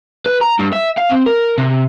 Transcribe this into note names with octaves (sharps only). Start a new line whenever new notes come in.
B4
A#5
G2
E5
F5
C4
A#4
C3